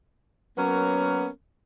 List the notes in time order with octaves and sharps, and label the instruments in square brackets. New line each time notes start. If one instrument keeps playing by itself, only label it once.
[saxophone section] F#3 A#3 B3 C#4 A#4